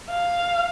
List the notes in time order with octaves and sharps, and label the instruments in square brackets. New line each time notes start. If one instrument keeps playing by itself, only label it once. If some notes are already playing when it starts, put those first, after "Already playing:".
[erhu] F5